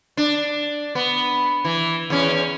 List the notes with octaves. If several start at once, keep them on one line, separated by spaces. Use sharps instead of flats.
D4
B3
E3
E2 C#4